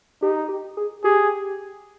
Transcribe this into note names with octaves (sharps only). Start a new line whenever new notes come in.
D#4 G4
G4
G#4
G4 G#4